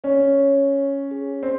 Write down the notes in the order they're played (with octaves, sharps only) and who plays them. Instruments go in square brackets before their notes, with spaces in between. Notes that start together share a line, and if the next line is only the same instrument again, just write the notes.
[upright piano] C#4 [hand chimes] C#5
[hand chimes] C#5
C#5
G#4
[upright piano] C4